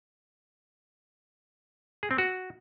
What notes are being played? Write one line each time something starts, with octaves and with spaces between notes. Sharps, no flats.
G#4
C4
F#4